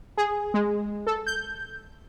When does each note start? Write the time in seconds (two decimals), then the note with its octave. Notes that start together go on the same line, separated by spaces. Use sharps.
0.17 G#4
0.54 G#3
1.07 A4
1.27 G6